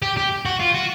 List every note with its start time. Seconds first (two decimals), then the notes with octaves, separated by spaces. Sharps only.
0.02 G4
0.17 G4
0.46 F#4
0.60 F4
0.75 F#4